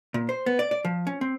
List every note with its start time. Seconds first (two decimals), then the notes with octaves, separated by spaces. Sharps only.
0.14 A#2
0.29 C5
0.46 B3
0.59 D5
0.71 D5
0.85 F3
1.07 C#4
1.21 C4